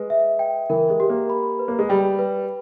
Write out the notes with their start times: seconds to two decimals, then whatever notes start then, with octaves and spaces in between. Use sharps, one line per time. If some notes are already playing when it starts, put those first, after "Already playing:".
Already playing: G#3 B4
0.10 E5
0.39 G5
0.70 E3 A#4
0.90 G#3
1.00 G4
1.10 A#3
1.30 B5
1.59 B4
1.68 A#3
1.79 G#3
1.89 G3 G5
2.19 B4